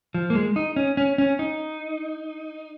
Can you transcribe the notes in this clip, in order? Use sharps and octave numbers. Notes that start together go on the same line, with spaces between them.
F3
A#3
G#3
D#4
C#4
C#4
C#4
D#4